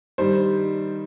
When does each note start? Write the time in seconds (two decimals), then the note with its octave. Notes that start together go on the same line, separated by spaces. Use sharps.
0.18 G2 D#3 G3 C5